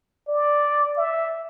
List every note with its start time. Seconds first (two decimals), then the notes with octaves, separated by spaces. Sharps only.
0.28 D5
0.97 E5